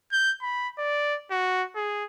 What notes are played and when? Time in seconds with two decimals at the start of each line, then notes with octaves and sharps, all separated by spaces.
0.12 G6
0.42 B5
0.78 D5
1.31 F#4
1.76 G#4